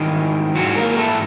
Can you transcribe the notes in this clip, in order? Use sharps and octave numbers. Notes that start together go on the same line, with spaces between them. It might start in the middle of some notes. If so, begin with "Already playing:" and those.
Already playing: G#2 D#3 E3 G3 D#4
G#2 E3 F#3 F#4
A#3 A#4
A3 A4